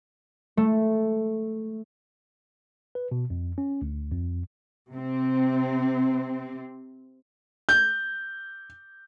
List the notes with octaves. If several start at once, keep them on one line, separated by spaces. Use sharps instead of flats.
A3
B4
B2
F2
C#4
D2
F2
C3 C4
G6